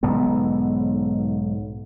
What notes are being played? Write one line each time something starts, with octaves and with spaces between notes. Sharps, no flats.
B1 G#2 D3 B3